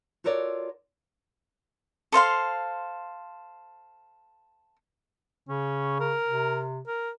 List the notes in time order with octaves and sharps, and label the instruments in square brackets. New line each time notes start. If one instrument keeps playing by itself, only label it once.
[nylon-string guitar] F4 F#4 A4 A#4 C#5 D5
[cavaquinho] A4 C5 F5 C6
[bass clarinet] C#3 [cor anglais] C#4
[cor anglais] A#4
[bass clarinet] C3
[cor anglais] A#4